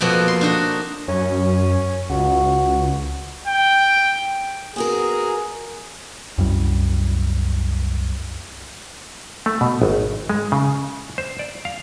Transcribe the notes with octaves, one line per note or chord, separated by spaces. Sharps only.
F2 B2 A#3 F#4 A4
C6
D4 D#4 F#4
F#2 C#4
C#2 F#4
G5
B3 F#4 G#4 A#4
C2 F#2 G3
A3
B2
G#1
G#3
C#3
C5
D5
F5